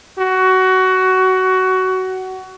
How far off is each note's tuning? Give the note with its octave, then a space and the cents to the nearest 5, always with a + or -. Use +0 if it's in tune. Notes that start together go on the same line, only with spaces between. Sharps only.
F#4 +20